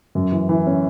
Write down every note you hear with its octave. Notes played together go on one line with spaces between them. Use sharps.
F#2
E3
E3
C#4